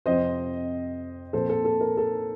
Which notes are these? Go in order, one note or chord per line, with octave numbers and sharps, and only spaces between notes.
F2 C3 F3 C4 C5 D#5
A#2 F3 C4 A4 C5
A4
A4
A#4
A4